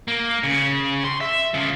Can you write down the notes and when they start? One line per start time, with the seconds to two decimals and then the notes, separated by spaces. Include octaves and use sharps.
0.08 A#3
0.43 C#3
1.04 C6
1.21 E5
1.54 C#3 F4